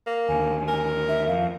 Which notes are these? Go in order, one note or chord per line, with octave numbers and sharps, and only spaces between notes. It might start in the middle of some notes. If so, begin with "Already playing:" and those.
A#3
D#2 D3 G#5
A#4
E5
F2 F5